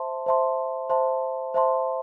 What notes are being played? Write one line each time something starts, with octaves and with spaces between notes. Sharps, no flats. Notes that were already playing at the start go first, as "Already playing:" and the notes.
Already playing: C5 E5 A5 C6
C5 E5 A5 C6
C5 E5 A5 C6
C5 E5 A5 C6